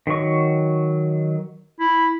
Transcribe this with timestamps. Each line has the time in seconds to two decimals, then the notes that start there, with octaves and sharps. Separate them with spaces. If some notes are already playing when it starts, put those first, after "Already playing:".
0.07 D#3 F#3 C#6
1.79 E4